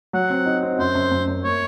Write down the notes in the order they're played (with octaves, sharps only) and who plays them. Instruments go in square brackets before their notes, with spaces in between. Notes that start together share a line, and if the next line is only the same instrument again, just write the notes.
[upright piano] F#3 [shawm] F#5
[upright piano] C4
D#4
C4
[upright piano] F#2 [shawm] C5
[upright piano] F#2
F#2
F#2
[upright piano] A#3 [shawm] C#5